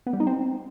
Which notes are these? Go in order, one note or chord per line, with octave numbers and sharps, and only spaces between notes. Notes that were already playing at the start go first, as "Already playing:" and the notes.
B3
G3
D#4
C4